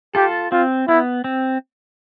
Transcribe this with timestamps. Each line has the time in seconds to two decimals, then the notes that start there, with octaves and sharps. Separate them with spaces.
0.15 F4 G4 A4
0.52 C4 F4
0.88 B3 E4
1.24 C4